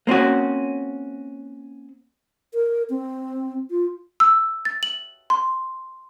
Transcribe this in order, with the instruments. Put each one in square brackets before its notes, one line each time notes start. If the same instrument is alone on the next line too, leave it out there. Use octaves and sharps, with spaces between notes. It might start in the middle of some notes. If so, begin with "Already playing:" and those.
[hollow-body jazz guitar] A#3 C4 C#4 F#4
[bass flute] A#4
C4
F4
[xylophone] E6
A6
F#7
C6